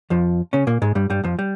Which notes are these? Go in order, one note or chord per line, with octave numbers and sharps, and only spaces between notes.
F2 F3
C#3 C#4
A#2 A#3
G#2 G#3
G2 G3
G2 G3
F2 F3
G3